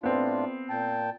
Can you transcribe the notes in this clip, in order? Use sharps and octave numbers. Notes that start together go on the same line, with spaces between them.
A2 B3 C4 D4 F4
A#2 G5 A5